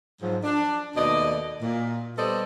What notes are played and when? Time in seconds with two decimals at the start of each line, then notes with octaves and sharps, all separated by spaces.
0.22 G#2 F3 F#3
0.44 D4
0.97 D#2 B2 A3 D5 D#5
1.62 A#2
2.18 G3 B3 A4 C5 D5 D#5